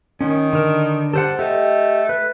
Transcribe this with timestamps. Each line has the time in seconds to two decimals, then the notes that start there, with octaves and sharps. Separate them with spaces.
0.21 D#3 C#4
0.53 D3 A#4
1.14 G3 A4 C5 F#5
1.39 A3 G4 D#5
2.09 B4